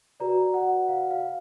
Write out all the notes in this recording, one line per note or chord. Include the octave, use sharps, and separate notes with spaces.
F#4 B4 D5 A#5
F#5
F5
F5